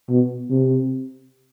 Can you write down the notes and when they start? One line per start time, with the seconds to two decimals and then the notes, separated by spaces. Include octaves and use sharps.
0.09 B2
0.50 C3